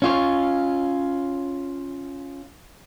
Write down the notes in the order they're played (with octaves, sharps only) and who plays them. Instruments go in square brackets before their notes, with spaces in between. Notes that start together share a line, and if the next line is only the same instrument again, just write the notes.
[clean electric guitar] C#4 F4 C#5